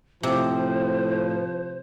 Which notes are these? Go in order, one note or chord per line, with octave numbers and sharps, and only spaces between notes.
A2 C3 F3 C5